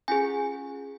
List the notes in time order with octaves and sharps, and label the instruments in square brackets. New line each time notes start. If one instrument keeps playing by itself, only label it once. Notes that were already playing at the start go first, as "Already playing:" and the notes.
[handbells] C#4 F4 G#4 G#5